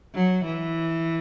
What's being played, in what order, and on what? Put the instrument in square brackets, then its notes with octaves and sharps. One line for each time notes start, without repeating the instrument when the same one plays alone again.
[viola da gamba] F#3
E3